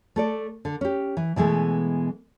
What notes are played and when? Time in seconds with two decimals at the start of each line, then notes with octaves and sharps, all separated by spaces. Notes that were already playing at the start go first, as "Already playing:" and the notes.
0.16 A3 A4 D5
0.65 D3
0.81 C#4 G4
1.17 E3
1.36 B2 E3 G#3 A3 B3